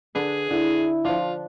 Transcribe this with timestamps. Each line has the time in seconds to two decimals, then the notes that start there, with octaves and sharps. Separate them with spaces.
0.15 D3 D4 G#4 B4
0.51 D3 E4
1.05 F3 D4 F4